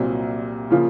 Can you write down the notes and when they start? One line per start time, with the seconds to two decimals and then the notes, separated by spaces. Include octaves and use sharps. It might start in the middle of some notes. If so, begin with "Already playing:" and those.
Already playing: C2 A#2 F#3 C4
0.70 C#3 F3 A#3 F4